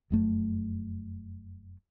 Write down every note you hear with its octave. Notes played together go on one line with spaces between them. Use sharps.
F1 F#2 A3